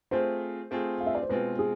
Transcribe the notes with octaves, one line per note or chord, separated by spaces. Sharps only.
A3 C4 F4 G#4 C5
A3 C4 F4 G#4
F5
E5
D5
C5
B2 G#3 C4 F4 B4
G#4